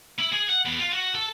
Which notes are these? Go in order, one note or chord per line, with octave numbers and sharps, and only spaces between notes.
E4
G#4
F#5
E2
F4
F#4
A4